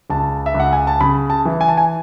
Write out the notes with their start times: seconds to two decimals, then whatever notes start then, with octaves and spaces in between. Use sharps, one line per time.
0.10 C#2 A5
0.46 E5
0.54 C#2
0.60 F#5
0.73 G#5
0.87 A5
1.01 C#3 B5
1.30 A5
1.45 E3
1.61 G#5
1.68 A5
1.77 G#5